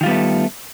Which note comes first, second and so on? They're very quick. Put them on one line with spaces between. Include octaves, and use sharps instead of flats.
D#3 F4 G3 B3 A3